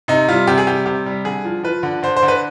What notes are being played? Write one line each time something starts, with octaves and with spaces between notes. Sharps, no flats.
C3 D#4
G3 F4
C3 G4
G#4
G3 G4
C3 G4
G3
D3 G#4
F3
F3 B4
D3
D3 C5
C5
D3
B4